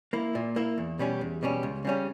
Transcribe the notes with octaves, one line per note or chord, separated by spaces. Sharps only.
A#3 E4
A#2
A#3 E4
E2
B2 G3 C#4
E2
B2 G3 C#4
C#2
C#3 G3 C#4